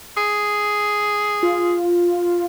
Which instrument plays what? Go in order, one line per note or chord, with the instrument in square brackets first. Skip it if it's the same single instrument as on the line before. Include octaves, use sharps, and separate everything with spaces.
[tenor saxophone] G#4
[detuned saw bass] F4